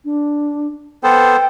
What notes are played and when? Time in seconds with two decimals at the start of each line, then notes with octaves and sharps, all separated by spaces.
0.05 D4
1.03 B3 A4 C5 G5